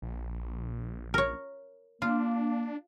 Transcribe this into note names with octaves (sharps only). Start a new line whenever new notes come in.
A#1
A#4 C#5
A#3 D4 F4